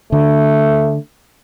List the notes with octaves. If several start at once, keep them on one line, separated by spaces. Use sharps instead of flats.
D3 A3